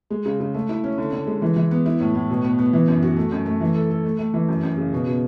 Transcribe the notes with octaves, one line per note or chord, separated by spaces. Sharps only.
G#3
C#3
C#3
A3
E4
C#4
D3
D3
G#3
E3
E3
B3
E4
A2
A2
B2
B3
B3
E3
F#2
F#4
A3
F#2
A3
E3
A4
A4
A3
A3
E3
F#2
F#2
C#3
B2
B2